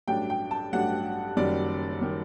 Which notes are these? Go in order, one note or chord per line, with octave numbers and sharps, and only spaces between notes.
A1 G2 F#3 A3 D4 G5
G5
A5
A1 G2 F#3 A3 D4 F#5
F#1 F#2 D#3 G3 D5
D#3 G3